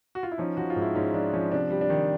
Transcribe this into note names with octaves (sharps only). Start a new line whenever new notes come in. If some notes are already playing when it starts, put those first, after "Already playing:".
F#4
F4
E4
F3 C#4 D#4
F3 F#4
F4
G#2
E4
G#2 C#4 D#4
F3 D4
F3 C#4
C3 D4
G3
D4
D#3